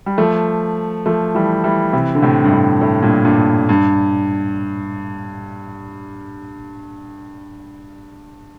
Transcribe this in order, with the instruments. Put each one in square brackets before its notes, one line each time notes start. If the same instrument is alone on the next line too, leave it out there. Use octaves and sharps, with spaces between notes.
[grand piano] G3
F3 A3
F3 A3
E3 G3
E3 G3
C3 E3
D3
A2 C3
G2
A2
A2
G2 A#2
G2 A#2
G2